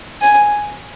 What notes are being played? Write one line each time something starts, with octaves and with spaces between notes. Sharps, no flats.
G#5